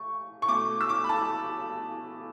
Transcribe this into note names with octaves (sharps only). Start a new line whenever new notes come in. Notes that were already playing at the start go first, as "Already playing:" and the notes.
Already playing: A3 C#6
C#6
B2 A3 D6
E6
D6
B5
A5